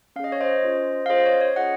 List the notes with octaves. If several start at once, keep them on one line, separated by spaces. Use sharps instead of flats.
C#4 G#4 D#5 F5
C#5
C5 D#5
C#4 F4 G#4
F5
C#4 F4 G#4 C5 D#5
C#5
C#5
C#4 F4 G#4 D#5 F#5